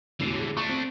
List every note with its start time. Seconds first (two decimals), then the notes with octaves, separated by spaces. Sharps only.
0.20 E1 A1 D3 E3 C7
0.39 G#4
0.57 A3 D4 C#6
0.69 C4